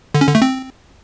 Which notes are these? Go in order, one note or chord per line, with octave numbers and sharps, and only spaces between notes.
D3
C#4
D3
A3
C4